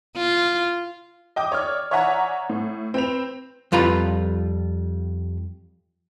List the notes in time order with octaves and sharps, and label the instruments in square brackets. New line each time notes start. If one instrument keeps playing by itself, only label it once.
[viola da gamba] F4
[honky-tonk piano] D#5 G5 D6 D#6
C#5 D5 F6
C#5 D5 E5 F#5 G#5 A#5
A2
C4 B4 F7
[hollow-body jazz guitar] F2 G3 F4 B4 A#5